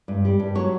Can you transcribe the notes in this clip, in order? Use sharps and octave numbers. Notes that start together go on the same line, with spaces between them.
G2
G3
G2
F#3 C#5